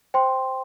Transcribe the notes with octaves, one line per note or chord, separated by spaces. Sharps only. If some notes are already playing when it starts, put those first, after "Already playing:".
C5 G5 C6